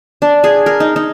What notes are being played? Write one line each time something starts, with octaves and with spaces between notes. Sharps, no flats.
D4
G#4
A#4
D#4
D#4